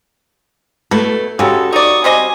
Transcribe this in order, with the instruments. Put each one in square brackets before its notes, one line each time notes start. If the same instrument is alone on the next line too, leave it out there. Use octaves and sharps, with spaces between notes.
[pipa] B2 A4 [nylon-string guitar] A3 E4 B4
[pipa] C#3 G#3 [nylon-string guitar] F#4 G4 C#5 [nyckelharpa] A4
[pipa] D#4 D5 [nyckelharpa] C#6 D#6
[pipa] G3 C4 D#5 [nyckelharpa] G#5